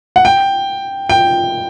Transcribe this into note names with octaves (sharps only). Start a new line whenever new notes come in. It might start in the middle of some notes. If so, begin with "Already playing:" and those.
F#5
G5
G5